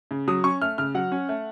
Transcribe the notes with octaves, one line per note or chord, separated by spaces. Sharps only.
C#3
F#3 D#6
C#4 C#6
A3 F6
C#3 F6
F#3 F#5
C#4
A3